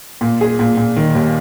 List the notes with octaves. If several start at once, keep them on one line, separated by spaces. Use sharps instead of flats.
A#2
G#4
A#2
A#2
D#3
D#2